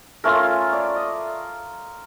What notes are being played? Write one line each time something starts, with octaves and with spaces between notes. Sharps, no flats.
A3 C#4 F4 A#4
D5
D#5